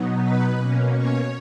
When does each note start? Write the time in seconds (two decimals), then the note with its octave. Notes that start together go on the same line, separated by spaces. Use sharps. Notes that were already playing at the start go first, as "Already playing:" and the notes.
Already playing: B2 F#3 B3 D#4
0.20 B4
0.57 B2 A#3 C#4
0.94 C#5